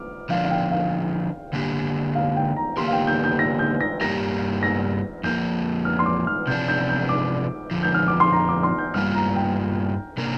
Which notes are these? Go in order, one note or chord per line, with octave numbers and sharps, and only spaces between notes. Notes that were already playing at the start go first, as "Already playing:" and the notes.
Already playing: D6 F6
D3 F3 D4 F5
F5
G5
F5
D3 A#3 D4 G4
F5
G5
A#5
D3 A#3 G4 A#4 C6
F5
G5
G6
G6
A#6
G6
A#6
G2 G3 A#3 G4 A#4 A#6
A#6
F2 F3 A#3 G6
F6
C6
D6
F6
C3 F3 D4 G6
G6
G6
D6
F2 D3 F3
G6
F6
D6
C6
A#5
D6
C6
G6
G2 G3 A#3 F4 F6
A#5
G5
C3 A#3 D4 A#4